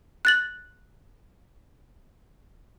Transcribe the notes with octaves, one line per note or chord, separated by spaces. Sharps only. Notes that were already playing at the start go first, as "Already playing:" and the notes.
F#6 A6 F#7